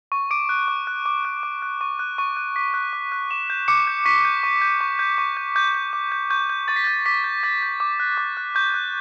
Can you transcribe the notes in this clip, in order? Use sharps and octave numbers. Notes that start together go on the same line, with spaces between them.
C#6
D6 D7
F#6
D6
F#6
D6
F#6
D6
F#6
C#6
F#6
C#6
F#6
D6 B6
F#6
D6
F#6
D6 E7
G6
D6 C#7
G6
C#6 B6
G6
C#6
G6
C#6
G6
C#6
G6
D6 G6
G6
D6
G6
C#6 G6
G6
C#6 A6
B6
G6 A6
D6 B6
G6
D6 A6
G6
D6
F#6
D6
F#6
C#6 G6
F#6